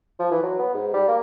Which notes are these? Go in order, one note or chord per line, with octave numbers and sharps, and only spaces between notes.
F3
E3
F#3
B3
G#2
G3
A#3